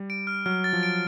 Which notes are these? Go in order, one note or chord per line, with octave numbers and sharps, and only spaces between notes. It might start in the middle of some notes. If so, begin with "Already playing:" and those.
Already playing: G3
D7
F6
F#3 F6
A6
F3
D7